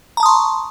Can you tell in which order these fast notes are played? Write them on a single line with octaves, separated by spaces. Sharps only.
A#5 A5 D#6 C6 C#6